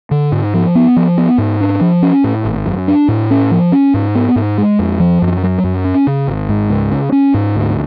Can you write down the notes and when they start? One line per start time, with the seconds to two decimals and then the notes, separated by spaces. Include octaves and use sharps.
0.11 D3
0.32 G#2
0.54 F3
0.75 B3
0.96 F3
1.18 B3
1.38 G#2
1.61 D4
1.81 F3
2.02 C#4
2.24 A2
2.45 G#1
2.66 F#2
2.88 D4
3.08 A2
3.31 C#4
3.51 F3
3.72 C#4
3.94 G#2
4.15 B3
4.36 G#2
4.58 G#3
4.79 F2
5.00 F3
5.22 F#2
5.43 F#3
5.64 F#2
5.85 C#4
6.07 C#3
6.28 G#1
6.49 G#2
6.70 C#2
6.91 C#3
7.12 C#4
7.34 G#2
7.55 D2